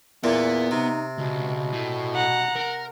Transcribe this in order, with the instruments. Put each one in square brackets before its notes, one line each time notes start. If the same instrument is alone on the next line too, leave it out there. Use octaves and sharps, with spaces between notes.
[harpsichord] E2 A#2 E3 [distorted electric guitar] B3
[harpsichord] C3 [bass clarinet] D#4
[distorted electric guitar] C#2 [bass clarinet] B2
[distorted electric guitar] A2
[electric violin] F#5 A#5
[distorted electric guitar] A#4